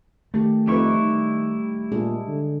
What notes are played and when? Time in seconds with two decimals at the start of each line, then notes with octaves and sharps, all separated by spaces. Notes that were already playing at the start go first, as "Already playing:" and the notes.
0.34 D#3 A3 G4
0.67 F2 G3 D#4 E4 B4 C#6
0.99 D#3
1.92 A#2 G#3 D4 G#4
2.27 D3